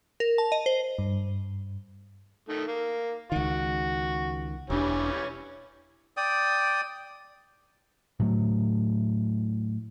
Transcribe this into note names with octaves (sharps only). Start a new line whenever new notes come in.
A#4
A5
D#5
C5
G2
D#3 A3
A#3
C#2 D#3 F#4
E1 E3 G3 C#4 D4
D5 G5 D#6
A2 F#3 A3